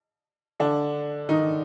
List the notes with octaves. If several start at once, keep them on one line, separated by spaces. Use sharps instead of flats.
D3 D4
D#3 D#4